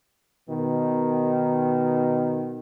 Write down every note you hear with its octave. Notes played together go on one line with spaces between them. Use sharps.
B2 D#3